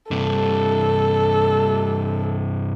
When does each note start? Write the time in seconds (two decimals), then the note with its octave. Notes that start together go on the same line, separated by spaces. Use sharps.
0.11 G2 C3 A4